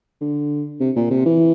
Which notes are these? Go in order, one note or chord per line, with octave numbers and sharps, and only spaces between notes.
D3
C3
A#2
C3
E3